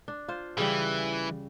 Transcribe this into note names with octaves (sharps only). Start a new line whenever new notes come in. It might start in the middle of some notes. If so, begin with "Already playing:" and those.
D4
F4 C5
C#3 E3 G3